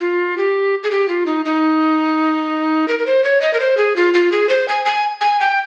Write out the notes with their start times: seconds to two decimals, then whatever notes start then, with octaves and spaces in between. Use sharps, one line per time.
0.01 F4
0.37 G4
0.83 G#4
0.91 G4
1.08 F4
1.26 D#4
1.45 D#4
2.88 A#4
2.99 A#4
3.06 C5
3.24 C#5
3.41 D#5
3.54 A#4
3.60 C5
3.77 G#4
3.96 F4
4.14 F4
4.32 G#4
4.49 C5
4.68 G#5
4.85 G#5
5.21 G#5
5.40 G5